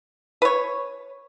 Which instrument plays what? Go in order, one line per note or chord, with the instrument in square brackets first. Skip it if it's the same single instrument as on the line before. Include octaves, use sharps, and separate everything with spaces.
[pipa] B4 C#5